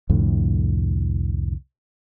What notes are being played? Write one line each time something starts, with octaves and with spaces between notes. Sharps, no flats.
C2 F2 A2 D3